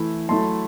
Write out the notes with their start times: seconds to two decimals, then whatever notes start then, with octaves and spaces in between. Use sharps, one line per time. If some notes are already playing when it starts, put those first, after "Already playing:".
Already playing: E3 A3 E4
0.29 F#3 A3 E4 A5 C6